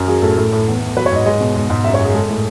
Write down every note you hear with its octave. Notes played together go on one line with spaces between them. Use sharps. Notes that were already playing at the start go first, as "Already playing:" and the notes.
Already playing: F#2
F#3 G#4
A2 A4
A2
A2
E2
E2
F#3 B4
C#5
G#2 D#5
G#3 D#5
B2
G#2
G#2
F#2 E5
C#5
F#2 G#4
G#3 A4
A2